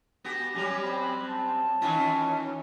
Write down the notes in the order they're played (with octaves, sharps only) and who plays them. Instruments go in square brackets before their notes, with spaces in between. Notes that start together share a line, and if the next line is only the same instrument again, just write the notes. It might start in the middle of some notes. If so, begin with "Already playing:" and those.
[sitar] B3 F#4 G4 [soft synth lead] A#6
[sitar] F#3 G3 C#4 [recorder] G4
[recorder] C4 [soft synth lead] B5
[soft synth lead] F#6
A5
[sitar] D#3 E3 F4 [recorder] C#4